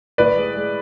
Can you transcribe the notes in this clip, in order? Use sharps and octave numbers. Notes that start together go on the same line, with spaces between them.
A2 B4 D5
G#3
G#3